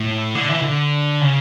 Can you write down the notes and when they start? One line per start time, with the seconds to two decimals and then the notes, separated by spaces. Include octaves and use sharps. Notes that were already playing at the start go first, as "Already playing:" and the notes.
Already playing: A2
0.35 D3
0.49 E3
0.62 D3
1.21 C#3